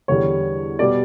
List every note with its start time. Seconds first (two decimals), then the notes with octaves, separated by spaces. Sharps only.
0.08 E2 D3 G3 C#5
0.79 B2 G3 D5